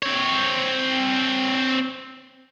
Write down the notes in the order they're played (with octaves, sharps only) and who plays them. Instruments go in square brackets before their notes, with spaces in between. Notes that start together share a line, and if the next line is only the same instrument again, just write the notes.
[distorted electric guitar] C4 C#5